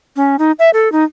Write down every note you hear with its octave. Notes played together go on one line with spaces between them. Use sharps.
C#4
D#4
E5
A4
D#4